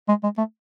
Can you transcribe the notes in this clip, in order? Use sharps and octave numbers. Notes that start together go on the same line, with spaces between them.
G#3
G#3
A3